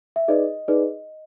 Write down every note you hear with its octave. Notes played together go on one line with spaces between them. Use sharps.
E5
D#4 G#4 B4 D5 D#5
D#4 G#4 B4 D5